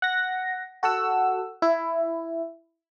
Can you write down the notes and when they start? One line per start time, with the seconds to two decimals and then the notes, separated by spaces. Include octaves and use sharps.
0.02 F#5 A#6
0.83 F#4 A4 F#5 E6
1.62 E4